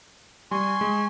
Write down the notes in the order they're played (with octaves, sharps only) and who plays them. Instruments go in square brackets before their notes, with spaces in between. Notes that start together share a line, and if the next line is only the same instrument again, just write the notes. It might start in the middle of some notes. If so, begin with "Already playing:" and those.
[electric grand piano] G3 [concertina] G#5 C6 C#6
[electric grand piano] G#3